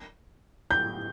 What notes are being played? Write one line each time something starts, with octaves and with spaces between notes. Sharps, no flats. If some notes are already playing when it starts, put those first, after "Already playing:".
G6